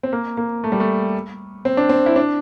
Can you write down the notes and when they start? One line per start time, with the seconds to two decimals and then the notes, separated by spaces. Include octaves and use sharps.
0.03 C4
0.12 A#3
0.37 A#3
0.64 A3
0.72 G3
0.80 A3
1.65 C4
1.77 D4
1.89 C4
2.06 E4
2.16 D4